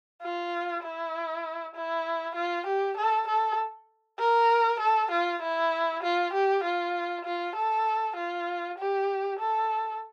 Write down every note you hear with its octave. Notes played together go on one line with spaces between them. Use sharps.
F4
E4
E4
F4
G4
A4
A4
A#4
A4
F4
E4
F4
G4
F4
F4
A4
F4
G4
A4